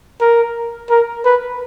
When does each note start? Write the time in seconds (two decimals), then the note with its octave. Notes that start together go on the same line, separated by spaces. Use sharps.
0.21 A#4
0.90 A#4
1.25 B4